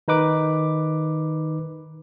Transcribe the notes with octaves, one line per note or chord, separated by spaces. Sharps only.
D#3 D#4 B4 D6